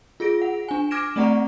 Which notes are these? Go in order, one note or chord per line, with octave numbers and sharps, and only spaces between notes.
F4 G#4 A#6 D7
F#5
D4 G#5
D6 F6 G#6 A#6 D7 E7
A3 C4 D5 F#5 A#5 C#6